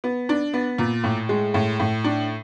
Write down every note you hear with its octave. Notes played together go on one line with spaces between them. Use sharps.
B3
D4
B3
A#2
A2
G#3
A2
A2
D4